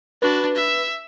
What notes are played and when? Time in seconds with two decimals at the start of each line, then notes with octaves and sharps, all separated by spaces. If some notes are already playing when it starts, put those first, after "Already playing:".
0.22 D4 F#4 B4
0.55 E5